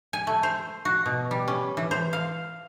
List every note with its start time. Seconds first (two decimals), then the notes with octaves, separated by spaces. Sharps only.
0.13 G#5
0.27 A3
0.43 C5
0.85 F#4
1.06 B2
1.31 G3
1.48 C#4
1.77 E3
1.91 C5
2.13 F5